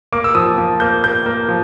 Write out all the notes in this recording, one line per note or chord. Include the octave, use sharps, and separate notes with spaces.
A#3 D6
E6
F3 D#6
F3
A#3 G6
A#3 G6
A#3
F3